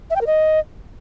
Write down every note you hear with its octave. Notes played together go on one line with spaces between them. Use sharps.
E5
G5
A#4
D#5